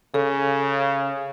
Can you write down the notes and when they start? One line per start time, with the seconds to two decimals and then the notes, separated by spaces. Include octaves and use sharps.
0.14 C#3 A4